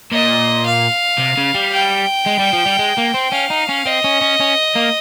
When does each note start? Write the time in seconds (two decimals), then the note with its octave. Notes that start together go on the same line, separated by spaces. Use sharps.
0.12 A#2 D#5
0.66 F5
1.19 C3
1.38 C#3
1.55 G3
1.72 G5
2.27 G#3
2.39 G3
2.53 F3
2.66 G3
2.79 G#3
2.98 A#3
3.14 C4
3.32 C#4 F5
3.51 D#4
3.69 C#4
3.86 C4 D#5
4.04 C#4
4.21 C#4
4.40 C#4
4.75 A#3